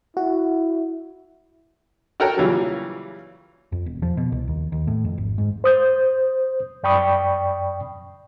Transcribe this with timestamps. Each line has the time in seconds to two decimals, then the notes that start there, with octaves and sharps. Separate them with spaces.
0.17 E4 F#4
2.20 F#4 A4 A#4 C#5 F#5 G5
2.37 A#2 C#3 E3 F#3 G3
3.72 F2
3.86 E1
4.02 F3
4.17 B2
4.32 C2
4.47 D#2
4.72 D#2
4.87 A2
5.05 F2
5.18 G#1
5.38 G#2
5.64 C5 D#6 G6
6.83 F#2 D5 G5 B5 C#6 D#6